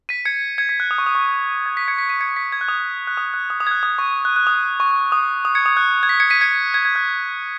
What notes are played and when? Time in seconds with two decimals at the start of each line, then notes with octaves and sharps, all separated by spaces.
0.09 B6 D#7
0.25 G#6 C#7
0.58 G#6 C#7
0.69 B6
0.80 F#6
0.91 D#6
0.98 C#6
1.06 D#6
1.15 C#6
1.66 G#6
1.77 B6
1.88 G#6 C#7
1.98 B6
2.09 B6 D#7
2.21 G#6 C#7
2.37 B6
2.52 G#6
2.61 F#6
2.68 D#6
3.07 F#6
3.17 D#6
3.34 F#6
3.50 D#6
3.60 D#6
3.67 G#6
3.71 F#6
3.83 D#6
3.98 C#6
4.25 F#6
4.36 F#6
4.47 D#6
4.80 C#6
5.12 D#6
5.45 D#6
5.55 G#6 C#7
5.66 D#6
5.77 F#6
6.03 G#6
6.09 B6
6.20 G#6 C#7
6.30 B6 D#7
6.41 G#6 C#7
6.74 G#6
6.85 G#6
6.96 F#6